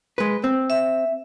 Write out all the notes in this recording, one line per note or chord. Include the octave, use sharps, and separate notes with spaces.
G#3 B4
C4
E5